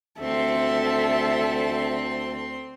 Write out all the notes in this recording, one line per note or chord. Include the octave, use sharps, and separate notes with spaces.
D2 C4 A4 E5 C6